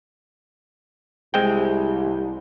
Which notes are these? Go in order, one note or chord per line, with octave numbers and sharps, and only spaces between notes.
C2 G#3 C4 G5